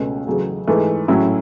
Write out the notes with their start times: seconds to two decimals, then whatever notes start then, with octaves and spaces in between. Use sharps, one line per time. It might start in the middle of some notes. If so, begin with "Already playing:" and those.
Already playing: C#2 B2 A3 C#4
0.27 E2 C#3 F#3 A3
0.67 G#2 E3 A3
1.08 A2 F#3 C#4 E4